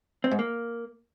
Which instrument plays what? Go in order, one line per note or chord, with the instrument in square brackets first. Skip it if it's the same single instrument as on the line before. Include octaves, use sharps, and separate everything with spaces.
[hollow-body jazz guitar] C4
G#2
A#3